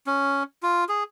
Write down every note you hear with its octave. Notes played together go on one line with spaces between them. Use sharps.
C#4
F4
G#4